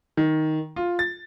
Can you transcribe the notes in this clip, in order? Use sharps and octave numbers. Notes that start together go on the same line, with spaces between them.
D#3
F4
A6